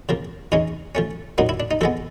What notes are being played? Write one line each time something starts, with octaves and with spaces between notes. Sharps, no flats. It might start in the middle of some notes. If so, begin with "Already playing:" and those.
C#3 F3 A#3
E3 G#3 C#4 D#4
F3 A3 C#4
A#2 F#3 A#3 D#4
E4
D4
D#4
F3 G#3 B3 A4